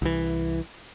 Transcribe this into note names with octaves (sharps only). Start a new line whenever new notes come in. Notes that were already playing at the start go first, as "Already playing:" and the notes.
C2 E3